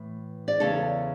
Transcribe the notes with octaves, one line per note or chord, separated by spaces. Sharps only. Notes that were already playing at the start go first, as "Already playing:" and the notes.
Already playing: A2 E3
D5
E2 C#3 E3 A4 C#5